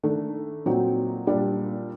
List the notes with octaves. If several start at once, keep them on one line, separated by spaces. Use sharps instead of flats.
D#3 A3 D4
A#2 F#3 C4 D#4
A#2 G3 D4